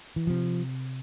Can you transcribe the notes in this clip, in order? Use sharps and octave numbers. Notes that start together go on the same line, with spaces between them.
E3
C3 F3